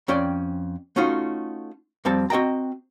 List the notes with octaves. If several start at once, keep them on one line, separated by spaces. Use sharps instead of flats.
F2 C#4 D5 G5
A3 C#4 D#4 F4 F#4
F2 G3 C4 A5
C4 F#4 D#5 G5 A#5